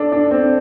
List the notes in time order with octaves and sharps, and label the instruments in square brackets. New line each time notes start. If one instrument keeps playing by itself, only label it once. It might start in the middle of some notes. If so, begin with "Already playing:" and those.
Already playing: [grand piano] D4 A4
D4
C4